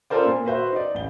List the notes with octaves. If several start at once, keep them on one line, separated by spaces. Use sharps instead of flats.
C#4 F4 A4 A#4 C5 D5
A#2
F#4 B4 C5 E5
D#4 D5
A1 G7